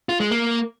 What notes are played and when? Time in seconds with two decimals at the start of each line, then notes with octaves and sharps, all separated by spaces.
0.09 F4
0.20 G#3
0.31 A#3